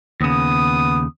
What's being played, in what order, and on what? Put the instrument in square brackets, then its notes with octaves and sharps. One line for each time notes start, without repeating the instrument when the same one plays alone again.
[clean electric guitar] D#2 C#3 [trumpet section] B3 D#6